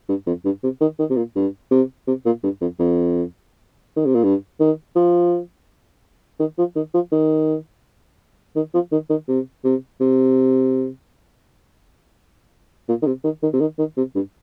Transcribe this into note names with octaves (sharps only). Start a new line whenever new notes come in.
G2
F2
G2
C3
D#3
D#3
C3
A#2
G2
C3
C3
A#2
G2
F2
F2
D#3
C3
A#2
G2
D#3
F3
D#3
F3
D#3
F3
D#3
D#3
F3
D#3
D#3
C3
C3
C3
A#2
D#3
C3
D#3
D#3
C3
D#3
D#3
C3
G2